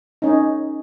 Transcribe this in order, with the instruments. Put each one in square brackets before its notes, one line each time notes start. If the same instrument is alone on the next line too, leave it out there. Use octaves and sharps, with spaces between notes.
[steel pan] C#4 D#4